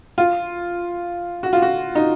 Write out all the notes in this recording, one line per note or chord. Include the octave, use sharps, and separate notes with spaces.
F4
F#4
F4
F#4
D#4